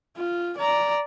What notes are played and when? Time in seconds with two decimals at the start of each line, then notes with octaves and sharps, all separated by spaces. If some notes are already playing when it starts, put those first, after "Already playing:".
0.17 F4
0.58 D5 A#5